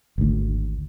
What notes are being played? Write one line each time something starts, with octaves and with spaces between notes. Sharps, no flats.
G#1 D2